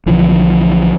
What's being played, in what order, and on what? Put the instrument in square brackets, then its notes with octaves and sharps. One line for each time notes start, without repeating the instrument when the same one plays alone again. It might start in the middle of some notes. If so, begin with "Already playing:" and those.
[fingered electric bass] B1 D3 E3 F3